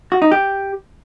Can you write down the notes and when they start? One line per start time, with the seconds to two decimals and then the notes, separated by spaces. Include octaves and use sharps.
0.12 F#4
0.22 D#4
0.31 G4